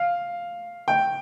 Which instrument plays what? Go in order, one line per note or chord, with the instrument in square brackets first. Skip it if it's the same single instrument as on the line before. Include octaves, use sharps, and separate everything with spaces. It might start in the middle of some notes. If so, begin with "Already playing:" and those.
Already playing: [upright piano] F5
G5